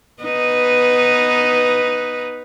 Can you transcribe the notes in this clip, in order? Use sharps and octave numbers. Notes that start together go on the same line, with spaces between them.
B3 D#4 B4